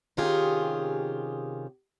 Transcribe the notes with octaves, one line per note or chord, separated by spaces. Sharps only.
C3 D#3 C#4 F4 G4 G#4